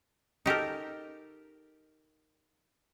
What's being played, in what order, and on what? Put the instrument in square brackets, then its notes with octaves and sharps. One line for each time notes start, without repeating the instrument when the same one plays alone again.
[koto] D#4 G4 A4 A#4